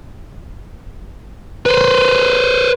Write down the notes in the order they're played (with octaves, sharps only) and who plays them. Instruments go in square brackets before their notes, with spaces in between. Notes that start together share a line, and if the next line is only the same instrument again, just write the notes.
[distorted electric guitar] B4 C5